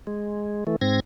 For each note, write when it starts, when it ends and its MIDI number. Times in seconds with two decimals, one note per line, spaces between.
0.07 0.64 56
0.67 0.76 52
0.67 0.76 57
0.81 1.00 44
0.81 1.00 60
0.81 1.00 92
0.81 1.00 94